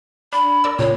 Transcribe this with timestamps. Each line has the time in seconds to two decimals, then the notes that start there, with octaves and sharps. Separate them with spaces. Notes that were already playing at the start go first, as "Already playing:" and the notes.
0.33 D4 B5
0.64 A#4 D5 E6
0.79 A#2 C#3 C#5